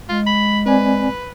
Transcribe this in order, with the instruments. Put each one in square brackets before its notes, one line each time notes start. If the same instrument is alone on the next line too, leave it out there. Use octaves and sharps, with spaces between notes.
[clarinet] G#3 [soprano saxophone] F4
[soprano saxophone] B5
[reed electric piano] C4 D5 G#5 [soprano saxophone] B4